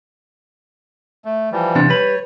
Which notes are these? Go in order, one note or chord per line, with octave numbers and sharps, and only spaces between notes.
A3
E3 F3 G3
E2 C3 D4
G3 B4 C#5 B5